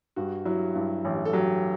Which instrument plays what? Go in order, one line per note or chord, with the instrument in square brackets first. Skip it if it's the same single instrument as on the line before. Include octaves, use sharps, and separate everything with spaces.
[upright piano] G2 [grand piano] F#4
[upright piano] F#3 [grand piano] E4
[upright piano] G2 [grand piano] E4
[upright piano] A1
[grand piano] A4
[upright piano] F#3 [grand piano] G4